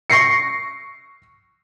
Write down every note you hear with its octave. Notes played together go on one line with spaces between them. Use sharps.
C#6 A#6 C7 C#7